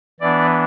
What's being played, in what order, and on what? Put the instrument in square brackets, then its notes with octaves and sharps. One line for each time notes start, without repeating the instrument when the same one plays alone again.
[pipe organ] E3 B3 D4 D5